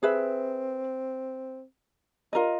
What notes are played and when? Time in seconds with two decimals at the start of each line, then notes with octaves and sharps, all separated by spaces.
0.02 C4 G#4 B4 E5
2.33 D4 F4 A#4 D#5